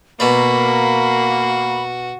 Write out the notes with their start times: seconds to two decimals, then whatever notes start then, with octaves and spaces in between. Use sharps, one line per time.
0.20 B2 A#3 F#4 D5 B5